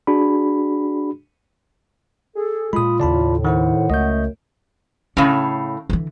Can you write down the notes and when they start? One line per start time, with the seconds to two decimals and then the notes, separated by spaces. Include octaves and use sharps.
0.07 D4 F#4 G#4 B5
2.36 G#4 A4
2.73 A#2 G#3 F4 B5 D#6
3.00 D#2 A2 C#3 D5 A5 B5
3.44 D#3 E4 C5 F#5
3.90 C#2 F#2 A3 D#5 G6
5.17 A2 C#3 C#4
5.90 D3 E3